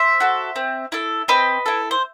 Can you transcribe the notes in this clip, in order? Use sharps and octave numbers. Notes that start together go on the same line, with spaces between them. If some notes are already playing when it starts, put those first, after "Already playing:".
Already playing: C5 E5
F#4 A4
C4
E4 A4
C4 B4 D#5
E4 A4
C5